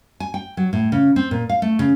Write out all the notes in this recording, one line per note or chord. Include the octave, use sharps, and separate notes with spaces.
G#5
G5
F#3
A2
C#3
C4
A#2
F5
A3
C#3